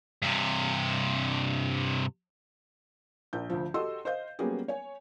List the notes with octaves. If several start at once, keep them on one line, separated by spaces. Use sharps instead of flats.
G2 C3
A#1 G6
D2 F3
F#4 G4 A4 D#5 C6 E6
C5 D#5 F5 G6
F#3 G3 A#3 B3 C#4 G#4
C#5 G#5